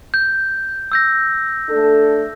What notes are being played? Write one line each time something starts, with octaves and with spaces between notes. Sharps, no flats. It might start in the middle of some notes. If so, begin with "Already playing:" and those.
G6
E6 G6 A#6
A3 D4 A4